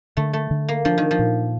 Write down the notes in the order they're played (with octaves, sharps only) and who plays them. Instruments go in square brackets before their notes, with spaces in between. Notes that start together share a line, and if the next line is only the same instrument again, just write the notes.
[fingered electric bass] D3 [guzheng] A3
[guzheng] A3
[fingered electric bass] D3
[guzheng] A#3
[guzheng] F3 [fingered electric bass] D4
[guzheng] D#3
F3
[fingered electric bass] A#2